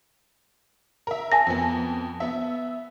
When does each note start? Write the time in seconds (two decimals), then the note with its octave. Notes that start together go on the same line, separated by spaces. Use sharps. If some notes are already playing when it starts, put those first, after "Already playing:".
1.07 A#4 E5
1.32 G#5 A5 A#6
1.47 F2 B3
2.20 B3 E5